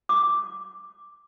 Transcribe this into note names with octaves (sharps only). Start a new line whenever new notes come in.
D6